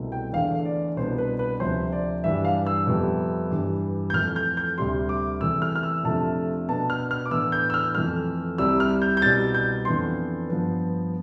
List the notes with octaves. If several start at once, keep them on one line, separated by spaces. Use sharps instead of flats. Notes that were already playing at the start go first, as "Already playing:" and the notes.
Already playing: C2 B2 A3 C4
G5
E2 D3 A3 D4 F5
D5
C2 B2 B3 D4 C5
B4
B4
D2 C3 F3 C4 C5
D5
G2 E3 G3 D4 E5
F5
E6
F2 C3 G3 B3
G2 E3 G3
G6
F2 E3 A3 F6
G6
G6
D2 C3 G3 C6
D6
E2 C3 E3 A3 E6
F6
F6
E6
F2 C3 F3 A3 D4 A5
B2 B3 D4 A5
F6
F6
D6
A2 E3 B3 D4 E6
G6
E6
F6
F2 E3 A3 F6
C2 C3 G3 C4 E6
F6
G6
G6
C2 B2 G3 C4 A6
G6
F2 E3 B3 D4 C6
G2 F3 B3